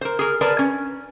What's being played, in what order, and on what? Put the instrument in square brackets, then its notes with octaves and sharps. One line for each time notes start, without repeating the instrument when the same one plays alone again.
[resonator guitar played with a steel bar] A#4 C5
G#4 A#4
G#4 A#4 B4 D5 A5
C#4